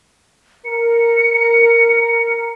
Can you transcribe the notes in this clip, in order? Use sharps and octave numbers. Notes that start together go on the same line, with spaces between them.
A#4 C#7